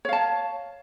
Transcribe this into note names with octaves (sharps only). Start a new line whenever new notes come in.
C#5 F5 A5